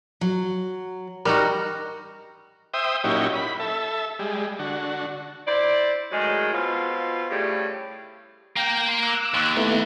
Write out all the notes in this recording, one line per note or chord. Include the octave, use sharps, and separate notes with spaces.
F#3
G3 D#4 F#4 A#4
C5 E5 G5 D#6
A#2 F#3 C#4 D#4 E4 G4
B5
A4 E5
G3 G#3
D3 F#4
E4 C5 D5
A2 D#3 F#3 G#3
B2 C4 F4
A2 C#3 G3 A3 G4
A#3 G5
C6
D6 E6 F#6
D#2
A3 B3 E4